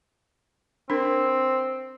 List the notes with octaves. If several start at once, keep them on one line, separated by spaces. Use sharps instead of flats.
C4 D4 A#4